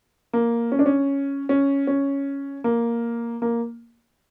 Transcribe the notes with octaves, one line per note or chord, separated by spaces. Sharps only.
A#3
C#4
D4
C#4
C#4
C#4
A#3
A#3